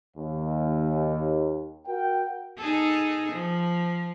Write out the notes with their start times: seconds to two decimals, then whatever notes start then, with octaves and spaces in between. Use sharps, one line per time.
0.16 D#2
1.86 F#4 A#4 G5
2.58 D#4 G#4 A4
3.33 F3